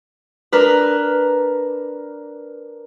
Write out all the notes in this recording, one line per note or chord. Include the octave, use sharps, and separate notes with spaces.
D4 A#4 B4